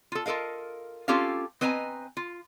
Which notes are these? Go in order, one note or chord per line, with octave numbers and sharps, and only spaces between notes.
F4 A4
F4 A4 A#4 D#5 F5
C4 C#4 F4 G4 A4 F5
C4 B4 D#5 G#5 A#5
F4